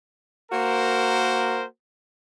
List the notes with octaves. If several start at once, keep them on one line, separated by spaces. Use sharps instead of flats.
A#3 F#4 A#4 C5